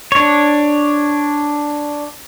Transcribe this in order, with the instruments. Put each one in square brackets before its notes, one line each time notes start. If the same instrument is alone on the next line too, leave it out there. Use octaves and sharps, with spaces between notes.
[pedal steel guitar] D4 C#5